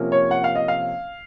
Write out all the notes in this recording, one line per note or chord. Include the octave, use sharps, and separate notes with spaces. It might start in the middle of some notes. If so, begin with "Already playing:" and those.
Already playing: C3 F3 A#3 C#4
C#5
F#5
F5
D#5
F5